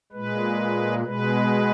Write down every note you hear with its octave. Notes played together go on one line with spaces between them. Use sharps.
A#2 G#3 B4
B2 G#3 B4